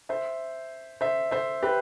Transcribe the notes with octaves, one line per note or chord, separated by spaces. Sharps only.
C5 E5
C5 E5
C5 E5
G4 B4